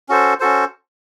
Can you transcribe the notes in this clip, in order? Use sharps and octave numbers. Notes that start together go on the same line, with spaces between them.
C#4 F#4 A4 C5
C#4 F#4 A4 C5